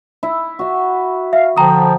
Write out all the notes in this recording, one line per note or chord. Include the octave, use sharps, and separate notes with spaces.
E4
F#4 E5
E5 F5
D3 F3 G5 A#5 D6 D#6